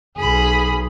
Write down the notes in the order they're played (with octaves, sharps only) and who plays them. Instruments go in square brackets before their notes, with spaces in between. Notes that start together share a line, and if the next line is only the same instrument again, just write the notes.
[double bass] B1 [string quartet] G#4 B5